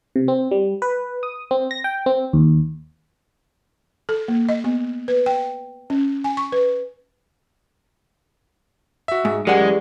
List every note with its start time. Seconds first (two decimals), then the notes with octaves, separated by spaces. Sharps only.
0.16 C3
0.28 C4
0.51 G3
0.82 B4
1.23 D#6
1.51 C4
1.71 A#6
1.84 G5
2.06 C4
2.33 D#2
4.09 A4
4.28 A#3
4.49 D#5
4.64 B3
5.08 B4
5.26 G5
5.90 C#4
6.24 G#5
6.37 C#6
6.52 B4
9.08 F#4 E5
9.25 G#2
9.47 F#2 G#3 G4 G#4 A#4 D5 F#5
9.61 E3